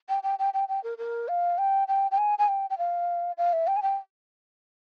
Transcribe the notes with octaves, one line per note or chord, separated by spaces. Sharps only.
G5
G5
G5
G5
G5
A#4
A#4
F5
G5
G5
G5
G#5
G#5
G5
G5
F5
F5
E5
G5
G#5
G5